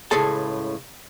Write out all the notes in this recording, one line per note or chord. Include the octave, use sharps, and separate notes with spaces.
C#2 A2 G#4 A4 A5